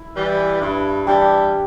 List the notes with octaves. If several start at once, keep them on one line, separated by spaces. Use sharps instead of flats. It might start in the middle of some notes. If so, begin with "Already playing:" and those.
Already playing: E4
E3 G3
G2 E4
E3 G3 D4 G4